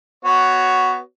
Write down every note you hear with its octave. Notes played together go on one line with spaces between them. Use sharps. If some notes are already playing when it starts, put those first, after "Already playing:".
B3 F#4 C#5